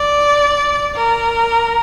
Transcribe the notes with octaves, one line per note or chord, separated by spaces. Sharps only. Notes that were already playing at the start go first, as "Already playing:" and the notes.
Already playing: D5
A#4